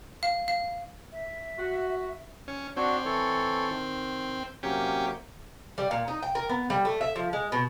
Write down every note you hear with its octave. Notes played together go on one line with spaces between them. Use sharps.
F5
F5
E5
F#4
C#4
C4 D4 F#4 C#5
E3 A4 C#5
D#3
C3 F#3 A#3 C#4 G4
G3
A#2
D#4
G5
A#4
B3
G3
A3
E5
F3
G#3
B2